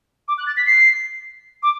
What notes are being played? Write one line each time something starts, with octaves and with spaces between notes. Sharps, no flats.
D6
F#6
A6
B6
C7
D6